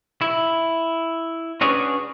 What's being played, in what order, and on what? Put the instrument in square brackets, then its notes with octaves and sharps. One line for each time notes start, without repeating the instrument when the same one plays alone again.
[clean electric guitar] E4
C#4 D4 F#4 G#4 B4 C#5